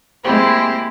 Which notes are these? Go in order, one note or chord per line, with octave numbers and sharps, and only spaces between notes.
G#3 A#3 C4 E4 G4 C5